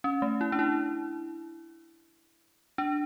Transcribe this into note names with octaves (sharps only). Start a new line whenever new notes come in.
C#4
A3
E4
D4
E4
D4